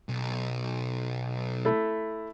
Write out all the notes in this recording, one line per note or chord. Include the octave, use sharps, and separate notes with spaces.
B1
A3 E4